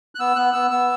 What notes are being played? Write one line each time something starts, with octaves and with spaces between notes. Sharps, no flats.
F#6
B3 E6
B3 F#6
B3 E6
B3 E6